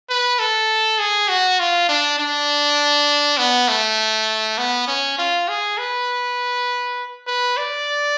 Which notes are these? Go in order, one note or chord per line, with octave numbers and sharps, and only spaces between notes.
B4
A4
G#4
F#4
F4
D4
D4
B3
A3
B3
C#4
F4
G#4
B4
B4
D5